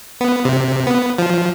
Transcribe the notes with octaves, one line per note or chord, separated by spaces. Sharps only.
B3
C3
B3
F3